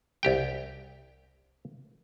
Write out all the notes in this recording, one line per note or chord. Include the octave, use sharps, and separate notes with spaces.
C2 G4 G5